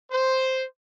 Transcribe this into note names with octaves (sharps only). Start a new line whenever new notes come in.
C5